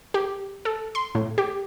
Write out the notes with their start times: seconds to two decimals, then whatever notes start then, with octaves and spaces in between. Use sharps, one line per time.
0.14 G4
0.65 A4
0.95 C6
1.15 A2
1.38 G4